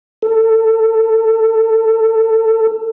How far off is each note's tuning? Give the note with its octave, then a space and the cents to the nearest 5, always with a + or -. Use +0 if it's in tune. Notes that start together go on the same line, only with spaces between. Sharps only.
A4 +25